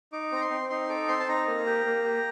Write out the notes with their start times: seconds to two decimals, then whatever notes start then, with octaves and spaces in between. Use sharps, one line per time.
0.12 D#4 D6
0.32 C4 A#5
0.41 C6
0.51 C4
0.70 D#4 C6
0.89 A4 D6
1.08 C4 C6
1.20 A5
1.28 D#4 A#5
1.48 A#3
1.66 G4
1.85 A#3
2.04 G4